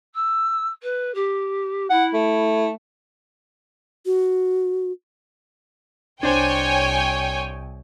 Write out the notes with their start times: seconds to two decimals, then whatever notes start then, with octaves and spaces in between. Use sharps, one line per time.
0.14 E6
0.82 B4
1.14 G4
1.90 E4 F#5
2.14 A3
4.06 F#4
6.23 C2 D4 C5 C#5 G5 G#5